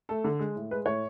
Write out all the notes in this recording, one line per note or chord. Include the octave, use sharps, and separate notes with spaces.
A3 A4
D3
G#3
A2
G#3 B4
A2 C#5